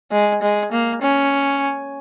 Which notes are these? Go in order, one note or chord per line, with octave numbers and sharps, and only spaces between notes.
G#3
G#3
A#3
C#4